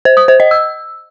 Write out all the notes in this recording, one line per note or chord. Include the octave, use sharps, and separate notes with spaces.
C5
D#6
C5
D#5
E6